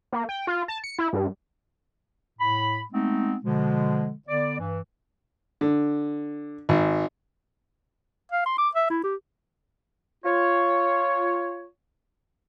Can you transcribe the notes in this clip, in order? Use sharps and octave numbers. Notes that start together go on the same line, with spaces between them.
A#3
G5
F4
A5
C#7
E4
G2
A2 B5
G#3 A3 B3 C4 D#4
B2 D3 F3 G#3
D3 B3 D5
G2 E3
D3
G#1
F5
C6
D6
E5
E4
G4
F4 C#5